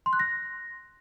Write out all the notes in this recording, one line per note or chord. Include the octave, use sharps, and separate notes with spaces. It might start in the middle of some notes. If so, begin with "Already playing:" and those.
C6
F#6
A#6